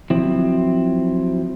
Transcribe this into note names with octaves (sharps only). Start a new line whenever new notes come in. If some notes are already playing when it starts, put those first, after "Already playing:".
F3 F#3 C4 E4